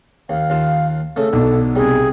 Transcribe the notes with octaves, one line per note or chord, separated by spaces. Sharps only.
D#2 F5
D#2 F4 A5
C#3 A3 A4
B1 B2 D3 D4
C2 G3 G#4